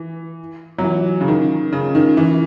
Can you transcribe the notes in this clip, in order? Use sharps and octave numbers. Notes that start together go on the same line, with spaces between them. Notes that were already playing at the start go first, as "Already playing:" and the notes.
Already playing: E3
F#3
E3
C#3
D#3
C#3
D#3
E3